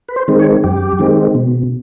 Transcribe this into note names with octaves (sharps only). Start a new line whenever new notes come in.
B4
C5
D#3 G#3 C4
C#5
F#2 G4
D#3 G#3 C4
B2